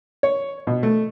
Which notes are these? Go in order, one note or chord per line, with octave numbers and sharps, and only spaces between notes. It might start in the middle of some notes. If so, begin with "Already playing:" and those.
C#5
B2
A3